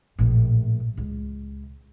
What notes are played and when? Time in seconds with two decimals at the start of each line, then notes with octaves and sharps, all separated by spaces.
0.19 A#1 A2
0.97 C#2